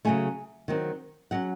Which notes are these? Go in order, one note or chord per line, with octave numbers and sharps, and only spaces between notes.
C#3 F#3 A3 G#5
D#3 F#3 C4
F#3 C#4 F#5